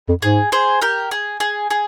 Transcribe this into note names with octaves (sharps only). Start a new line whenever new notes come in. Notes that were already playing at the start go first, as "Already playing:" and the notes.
F2
G#2 G#4
G#4 C5
G4 A#4
G#4
G#4
G#4